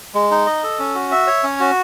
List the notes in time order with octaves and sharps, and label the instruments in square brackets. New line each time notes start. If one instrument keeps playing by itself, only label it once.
[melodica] G#3
D#4
D#5
A4
C#4
F#4
E5
C#5
C#4
F#4